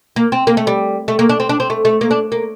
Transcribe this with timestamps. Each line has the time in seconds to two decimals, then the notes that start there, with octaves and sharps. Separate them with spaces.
0.16 A#3
0.32 C4
0.47 A#3
0.57 A3
0.67 G3
1.08 A3
1.19 A#3
1.29 D4
1.40 C4
1.49 D4
1.60 C4
1.70 A3
1.85 A3
2.01 A#3
2.11 D4
2.32 A#3